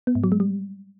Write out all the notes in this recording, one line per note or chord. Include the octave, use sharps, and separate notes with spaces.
B3
G#2
F#3
G#3
G3